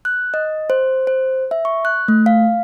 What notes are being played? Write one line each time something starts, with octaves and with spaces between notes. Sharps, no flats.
F#6
D#5
C5
C5
E5
C#6
F#6
A3
F5